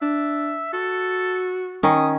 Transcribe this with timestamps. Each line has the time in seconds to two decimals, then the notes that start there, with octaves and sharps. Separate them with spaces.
0.02 D4 E5
0.73 F#4 A4
1.83 D#3 C#4 D#6